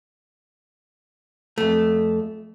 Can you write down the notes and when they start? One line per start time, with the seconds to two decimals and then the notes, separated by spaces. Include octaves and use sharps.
1.58 F2 A3